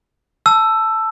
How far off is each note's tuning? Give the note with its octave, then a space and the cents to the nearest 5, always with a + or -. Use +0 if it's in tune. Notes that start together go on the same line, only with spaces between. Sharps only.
A5 +0 E6 +10